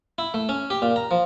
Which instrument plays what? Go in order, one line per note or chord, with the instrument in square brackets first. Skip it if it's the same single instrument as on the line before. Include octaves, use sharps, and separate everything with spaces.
[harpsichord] E4
A3
C#4
G4
A#2
A#5
F3